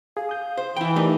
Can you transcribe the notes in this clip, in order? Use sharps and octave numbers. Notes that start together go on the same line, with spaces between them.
G#4 F5
D#6 G6
C5
E3 E4 G5 B5
A3 D#4 G4 A#4 B4 D5